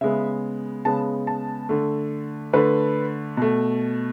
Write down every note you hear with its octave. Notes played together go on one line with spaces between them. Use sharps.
C#3 G#3 B3 E5
C#3 G#3 B3 A5
A5
D3 A3
D3 A3 B4
B2 A3